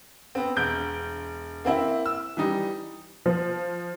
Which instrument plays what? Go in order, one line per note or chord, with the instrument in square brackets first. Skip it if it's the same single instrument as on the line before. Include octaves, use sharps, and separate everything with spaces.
[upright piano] B3 C4
E1 G6 D7
A#3 C4 E4
E6
E3 G3 D#4
[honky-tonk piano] F3